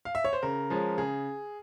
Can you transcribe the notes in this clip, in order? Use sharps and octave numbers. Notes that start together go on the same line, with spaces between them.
F5
E5
C#5
C5
C#3 A#4
F3 G#3 C#4
C#3 G#4